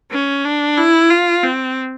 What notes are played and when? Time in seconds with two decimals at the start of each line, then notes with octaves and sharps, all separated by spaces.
0.12 C#4
0.45 D4
0.78 E4
1.10 F4
1.43 C4